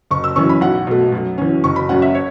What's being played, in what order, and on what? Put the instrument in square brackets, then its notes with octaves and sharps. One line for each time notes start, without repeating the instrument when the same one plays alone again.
[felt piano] F#1 C#6
E6
F#2 E3 C#4 C#6
B5
B1 F#5
B2 A3
F#2
E3 C#4
F#1 C#6
B5
F#2 F#3 C#4 F#5
E5
C#5